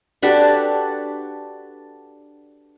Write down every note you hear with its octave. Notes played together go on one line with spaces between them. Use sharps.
D4 F#4 G4 A4 B4 D5